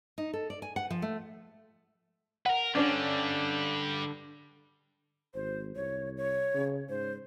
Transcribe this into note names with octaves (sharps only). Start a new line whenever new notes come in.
D#4
A4
D5
G#5
F#5
F3
A3
A#4 B4 F#5
G2 D3 G3 C#4 D4
G#1 C5
C2 C#5
C#5
C#3
G#2 C5